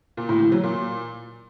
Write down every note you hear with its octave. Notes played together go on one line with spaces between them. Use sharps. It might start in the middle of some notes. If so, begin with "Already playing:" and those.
A#2
A2
E3
F#3
A#2